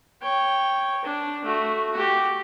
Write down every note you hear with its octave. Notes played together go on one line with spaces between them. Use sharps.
C#5 G5
D4
A3 F#4
F#4 G4